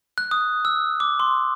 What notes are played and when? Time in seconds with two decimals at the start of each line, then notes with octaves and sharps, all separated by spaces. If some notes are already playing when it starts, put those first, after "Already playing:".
0.18 F#6
0.31 D#6
0.65 E6
1.00 D6
1.20 C6